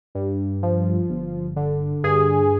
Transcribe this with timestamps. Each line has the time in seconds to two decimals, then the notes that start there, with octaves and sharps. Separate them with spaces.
0.15 G2
0.63 F3
1.09 G1
1.56 D3
2.03 G2 G#4